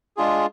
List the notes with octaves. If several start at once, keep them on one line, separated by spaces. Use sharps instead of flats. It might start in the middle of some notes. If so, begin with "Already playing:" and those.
G#3 D4 F4 G#4